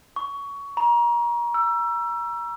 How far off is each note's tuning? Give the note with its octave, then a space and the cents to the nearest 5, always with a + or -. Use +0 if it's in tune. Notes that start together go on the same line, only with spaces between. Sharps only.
C#6 +20
A#5 +30
E6 +25